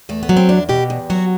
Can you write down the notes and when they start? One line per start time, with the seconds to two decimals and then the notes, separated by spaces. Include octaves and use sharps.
0.09 E2 A3
0.23 B3
0.29 F#3
0.37 C4
0.49 E2 D4
0.69 B2 G4
0.90 E2
1.10 F#3 F#4